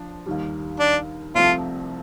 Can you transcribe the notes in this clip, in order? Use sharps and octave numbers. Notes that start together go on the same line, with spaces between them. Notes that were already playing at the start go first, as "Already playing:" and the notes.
Already playing: F3 D4
D#2 D#3 G3
D4
C2 C3 F3 A3 F4